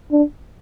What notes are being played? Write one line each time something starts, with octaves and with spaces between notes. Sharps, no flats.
D4